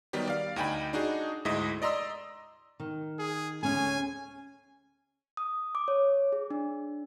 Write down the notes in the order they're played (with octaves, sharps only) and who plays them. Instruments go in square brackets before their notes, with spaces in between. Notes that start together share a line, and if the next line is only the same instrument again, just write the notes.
[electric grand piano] D#3 F#3 G3 B3 D#4 G4
D5 F5
D2 D#4 G5 G#5 B5
D4 D#4 F#4 G#4
D2 G#2 G#3 E4 D#5 B6
D5 D#5 A#5 C6 E6
[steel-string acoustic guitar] D#3
[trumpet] G#4
[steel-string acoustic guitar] D2 C#4 G#4 [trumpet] G#5
[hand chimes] D#6
D6
C#5
G#4
D4